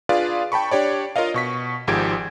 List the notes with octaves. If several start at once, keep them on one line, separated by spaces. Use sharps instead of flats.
D4 F4 G#4 B4 D5 F5
G5 A5 B5 C#6
D4 G4 C#5 D5
F4 A#4 C#5 D#5 F5
B2 C#6 B6
G#1 G#2 F3 G4 G#6 D7